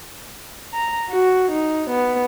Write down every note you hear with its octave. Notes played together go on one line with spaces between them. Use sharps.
A#5
F#4
D#4
B3